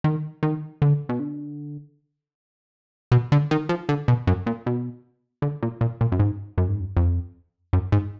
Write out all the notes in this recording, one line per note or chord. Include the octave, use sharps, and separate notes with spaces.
D#3
D#3
D3
B2
D3
B2
D3
D#3
F3
D3
B2
F#2
A#2
B2
D3
A#2
A#2
A#2
F#2
G#2
F#2
G#2
F#2
F2
F#2
G#2